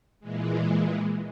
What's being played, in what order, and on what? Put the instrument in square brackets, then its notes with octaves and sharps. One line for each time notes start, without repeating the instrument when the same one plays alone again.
[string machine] A#2 E3 G#3